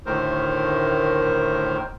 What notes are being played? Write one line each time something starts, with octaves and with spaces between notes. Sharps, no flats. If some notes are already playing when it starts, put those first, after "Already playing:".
D2 A2 D#3 A#4 C5